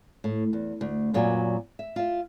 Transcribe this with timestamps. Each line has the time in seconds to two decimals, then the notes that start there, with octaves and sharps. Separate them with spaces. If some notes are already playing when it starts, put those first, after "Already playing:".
0.24 A2
0.53 E2
0.81 D2
1.14 F#2 A#2 F#3 B3 D5 G#5
1.79 E5
1.96 F4 E5